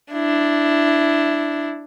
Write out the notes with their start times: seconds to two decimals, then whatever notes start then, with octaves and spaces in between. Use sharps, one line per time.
0.12 D4 E4